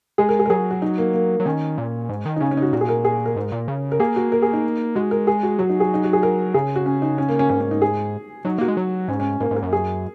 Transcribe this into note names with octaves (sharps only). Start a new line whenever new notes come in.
G#3 G#4
A#4
G#4
A#4
F#3 G#4
F#4
D#4
A#3
A#3
F#3
D#3 C#4
A#2
G#2
D#3
D#4
C#3 C#4
C#4
D#4
F#4
A#2 F#4
G#4
A#4
G#4
A#4
G#2
A#2
C#3
A#4
A#3 G#4
F#4
A#4
G#4
D#4
G#3 F#4
A#4
G#4
F#4
F#3 F#4
D#4
G#4
D#4
F#4
G#4
A#4
C#3 G#4
F#4
C#4
D#4
C#4
A#3
C#4
G#2 C#4
C#4
D#4
G#4
F#3 D#4
A#3 F#4
G#3
F#3
G#2 C#4
C#4
G#2 A#3
G#2
A#4
F#2
G#4